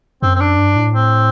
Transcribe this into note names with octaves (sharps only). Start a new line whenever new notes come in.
F#2 C4
C4
D4
G2
A2
C4